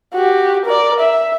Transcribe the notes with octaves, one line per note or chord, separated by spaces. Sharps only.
F#4 G4
A#4 D5
E5